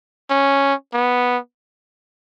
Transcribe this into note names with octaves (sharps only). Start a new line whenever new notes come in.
C#4
B3